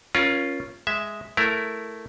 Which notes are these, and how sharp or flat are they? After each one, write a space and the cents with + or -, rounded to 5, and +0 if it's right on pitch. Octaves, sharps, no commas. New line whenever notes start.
C#4 +0 F4 +0 A#4 +30
G#3 +0 E5 -5
A3 +0 E4 +0 A#4 +0